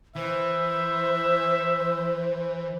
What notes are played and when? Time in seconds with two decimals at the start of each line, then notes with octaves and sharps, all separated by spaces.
0.16 E3 C5 E5